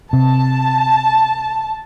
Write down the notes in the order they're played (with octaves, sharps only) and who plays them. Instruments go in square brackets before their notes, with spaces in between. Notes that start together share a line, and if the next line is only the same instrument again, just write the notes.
[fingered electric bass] C3 [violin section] A5